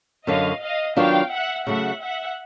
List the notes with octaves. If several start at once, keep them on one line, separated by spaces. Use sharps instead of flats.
F#2 D3 F#3 D#5 F5
D#5 F5
D#3 F#3 B3 D4 F4 F5 G5
E5 F#5
C#3 F#3 A3 E5 F#5
E5 F#5